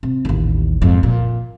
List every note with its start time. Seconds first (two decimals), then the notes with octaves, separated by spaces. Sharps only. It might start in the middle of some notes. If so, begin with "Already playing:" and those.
0.03 C3
0.25 A1 D#2
0.82 F2 G#2
1.03 A#2